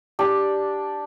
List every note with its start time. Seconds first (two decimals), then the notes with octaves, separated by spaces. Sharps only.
0.19 D4 G4